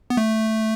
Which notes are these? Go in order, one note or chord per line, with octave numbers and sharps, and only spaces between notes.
B3
A3